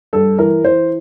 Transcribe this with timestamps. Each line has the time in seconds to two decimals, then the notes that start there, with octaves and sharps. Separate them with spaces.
0.13 G2 A4
0.39 E3 A#4
0.64 E3 C5